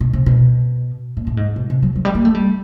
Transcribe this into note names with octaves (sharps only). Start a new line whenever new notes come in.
B2
C3
B2
A#2
A2
G#2
B2
C3
F#3
F#3
G3
A#3
A3
G3